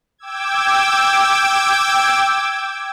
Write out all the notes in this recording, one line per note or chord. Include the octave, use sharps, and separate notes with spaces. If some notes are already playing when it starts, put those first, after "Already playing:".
G5 D6 E6 G#6